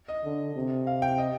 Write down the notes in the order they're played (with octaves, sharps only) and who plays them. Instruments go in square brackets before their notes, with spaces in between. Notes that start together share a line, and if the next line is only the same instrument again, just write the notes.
[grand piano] D#5
[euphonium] D3
C3
[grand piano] F5
G5
D#5